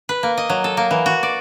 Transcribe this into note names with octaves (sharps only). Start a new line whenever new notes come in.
B4
A#3
D#5
F#3
A4
A#3
E3
F#4
D5